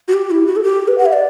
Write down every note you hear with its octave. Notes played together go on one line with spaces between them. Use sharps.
F#4
G4
E4
F#4
A4
G4
B4
F#5
E5
D5